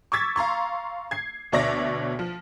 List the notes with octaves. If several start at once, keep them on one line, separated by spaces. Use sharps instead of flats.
C#6 D6 E6 G#6 A6 B6
F5 A#5 C6 C#6
G#6 C7
D2 B2 C#5 D5 E5 A#6
F3